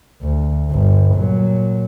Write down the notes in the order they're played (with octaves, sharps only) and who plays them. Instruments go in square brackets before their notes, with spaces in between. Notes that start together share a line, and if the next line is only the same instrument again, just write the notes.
[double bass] D2
G1
A#2 F#3